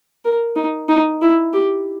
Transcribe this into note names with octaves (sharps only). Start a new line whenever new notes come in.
A#4
D#4
D#4
E4
G4